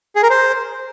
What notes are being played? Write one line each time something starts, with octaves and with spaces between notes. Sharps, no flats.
G#4
A#4
C5